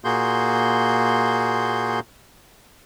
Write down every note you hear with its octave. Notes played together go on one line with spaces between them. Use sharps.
A#2 A#3 F#4 G#4 C6 G6